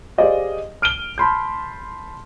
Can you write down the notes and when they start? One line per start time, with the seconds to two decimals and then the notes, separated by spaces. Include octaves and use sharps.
0.18 G4 G#4 C5 D5 D#5 F5
0.82 F6 D7 D#7 G7
1.18 A5 B5 C6 G6